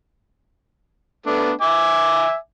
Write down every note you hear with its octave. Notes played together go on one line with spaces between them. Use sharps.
A3 B3 D4
E5 G#5 D6